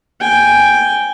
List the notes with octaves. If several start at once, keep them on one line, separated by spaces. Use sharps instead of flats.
G5 G#5